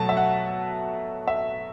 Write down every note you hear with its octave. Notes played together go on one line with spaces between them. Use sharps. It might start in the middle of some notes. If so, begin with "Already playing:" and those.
Already playing: B2 F#3 A3 A5
E5
F#5
E5